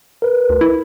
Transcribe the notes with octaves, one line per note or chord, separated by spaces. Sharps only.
A#4 B4
D2
E4